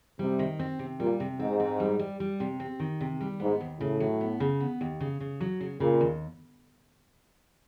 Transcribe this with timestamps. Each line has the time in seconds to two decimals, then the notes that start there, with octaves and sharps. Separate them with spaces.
0.19 C3 G3
0.39 D#3
0.59 C4
0.79 C3
1.00 A#2 G3
1.20 C3
1.39 G#2 C4
1.60 C4
1.80 G3
1.99 G3
2.20 G3
2.40 C3
2.60 C4
2.80 D#3
3.01 C3
3.21 G3
3.40 G#2 B3
3.61 D#2
3.80 A2 C#3
4.00 F#3
4.21 B3
4.40 C#3
4.60 B3
4.81 D#2
5.00 C#3
5.20 C#3
5.41 F#3
5.60 C#3
5.80 A#2 C#3
6.01 D#2